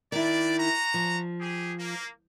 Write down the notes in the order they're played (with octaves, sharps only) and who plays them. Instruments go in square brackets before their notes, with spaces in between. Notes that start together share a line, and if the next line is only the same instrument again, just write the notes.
[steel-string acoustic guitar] D#3 E4 [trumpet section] D4 D5
[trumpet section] F#4 A#5
[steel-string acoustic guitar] F3
[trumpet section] G4 G#4
A#3